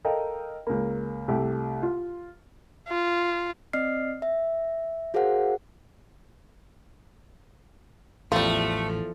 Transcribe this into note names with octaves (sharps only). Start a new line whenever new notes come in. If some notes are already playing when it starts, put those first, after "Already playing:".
A4 A#4 D#5 F5 G5
C#2 A#3
C2 A3 G4
F4
F4
C4 D5 D#5 F6 C7
E5
F#4 G#4 A#4 C5 F5 F#5
A1 E2 F3 G3 A3 F4